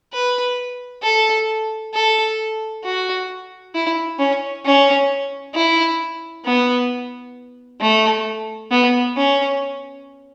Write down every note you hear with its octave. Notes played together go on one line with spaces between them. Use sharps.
B4
A4
A4
F#4
E4
C#4
C#4
E4
B3
A3
B3
C#4